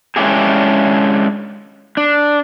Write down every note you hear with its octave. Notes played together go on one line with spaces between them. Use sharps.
G#3 C#4 D4 E4 G4 G#4
D4